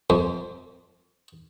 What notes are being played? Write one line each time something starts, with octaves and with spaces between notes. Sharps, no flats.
F2